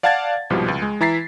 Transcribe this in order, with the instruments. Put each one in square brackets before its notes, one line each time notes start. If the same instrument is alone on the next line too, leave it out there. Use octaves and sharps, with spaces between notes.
[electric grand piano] D5 F5 F#5 A5 G#6 A6
C2 G#2 B2 F3 G3
C#2
G#3
E3 E4 A#5 A6 B6 C7